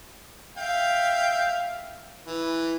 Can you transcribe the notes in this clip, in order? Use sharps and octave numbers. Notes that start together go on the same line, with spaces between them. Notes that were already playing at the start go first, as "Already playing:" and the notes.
E5 F5 G5
E3